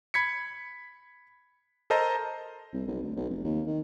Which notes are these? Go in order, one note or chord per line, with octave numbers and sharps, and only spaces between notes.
B5 G#6 B6 C#7
A4 A#4 C5 D#5 A5 A#5
C2
B1
D2
B1
F1
D#2
D#3